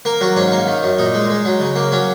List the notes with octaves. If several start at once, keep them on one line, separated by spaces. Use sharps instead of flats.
A#3 A#4
F#3 F#4
G#2 C#4
A#3
D#3
F#2
A#2 D#4
G#3
G#3
F#3
C#3
A#3
F#3 C#4